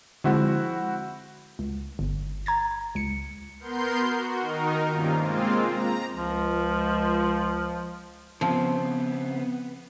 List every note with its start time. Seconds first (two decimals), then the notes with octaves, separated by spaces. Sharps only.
0.24 D3 F3 G#3 C4 E4 F#4
1.59 C#2
1.99 G1
2.46 A#5 G#6 A6
2.95 C#2 C#7
3.60 B3 A#4 C6 G6
3.97 F#4
4.40 D#3 D#4 A#4
4.90 G2 C3 D#3 A#3 C#4 F4
5.20 G#3 A#3 C4 F4
5.68 A#5
6.15 C#2 F3
8.41 C#3 F3 B3 C4